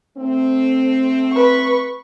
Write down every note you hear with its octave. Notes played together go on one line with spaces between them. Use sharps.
A3 C4
B4 C#6